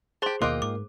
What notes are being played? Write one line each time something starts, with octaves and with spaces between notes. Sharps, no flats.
G4 G#4 C5 A5 C6
D#2 B2 A#3 F4 D#5 G5 D6 F#6
G#2 D6